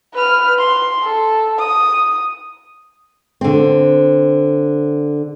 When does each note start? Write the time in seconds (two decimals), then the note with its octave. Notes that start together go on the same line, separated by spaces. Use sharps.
0.14 B4 F6
0.59 C6
1.03 A4
1.59 D#6
3.41 D3 C4